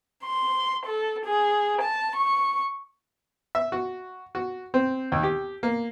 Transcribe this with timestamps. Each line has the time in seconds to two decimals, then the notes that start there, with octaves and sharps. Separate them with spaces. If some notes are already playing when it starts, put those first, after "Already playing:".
0.24 C6
0.85 A4
1.25 G#4
1.80 A5
2.16 C#6
3.55 E5
3.72 F#4
4.35 F#4
4.74 C4
5.12 D#2
5.23 G4
5.63 A#3